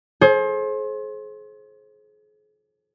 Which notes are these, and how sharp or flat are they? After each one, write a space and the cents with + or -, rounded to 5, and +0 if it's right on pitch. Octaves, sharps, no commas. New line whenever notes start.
G#4 +40 C5 +30